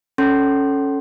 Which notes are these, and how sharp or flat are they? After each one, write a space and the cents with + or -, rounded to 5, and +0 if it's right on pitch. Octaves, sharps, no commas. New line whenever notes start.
C#4 +0 A4 +0 C6 +15